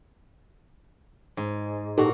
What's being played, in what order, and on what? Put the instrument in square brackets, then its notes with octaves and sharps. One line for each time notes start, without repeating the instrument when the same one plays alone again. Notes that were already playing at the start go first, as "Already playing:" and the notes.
[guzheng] G#2
[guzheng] A#2 F#4 [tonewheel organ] D#4 G4 A4